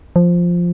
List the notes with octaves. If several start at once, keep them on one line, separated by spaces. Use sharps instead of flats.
F3